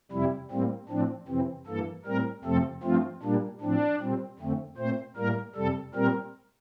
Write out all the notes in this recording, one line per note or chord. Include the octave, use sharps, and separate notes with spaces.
F2 C3 G3 E4
A2 G3 A#3 C4
A2 F3 C4 D4
F2 C3 E3 C4
G2 E3 A#3 A4
A2 G3 C4 A#4
F2 C3 F3 A3 C4 A4
G2 F3 A3 C4 F4
A#2 G3 A#3 D4
A2 F3 C4 D4
A#2 G3 C4
F2 D3 A3 C4
A#2 A3 C4 C5
A2 G3 A#3 A#4
F2 C3 G3 A4
A#2 G3 C4 A#4